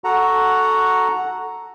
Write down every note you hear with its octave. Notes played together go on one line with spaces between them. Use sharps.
F#4 A4 F#5 A#5